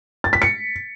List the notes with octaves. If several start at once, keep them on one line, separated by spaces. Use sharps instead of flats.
A6
B6
C#7